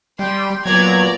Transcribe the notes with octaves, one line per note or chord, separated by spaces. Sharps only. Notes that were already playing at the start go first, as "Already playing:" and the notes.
G3 G5 C6
A#2 F#3 B3 D5 A#5 G#6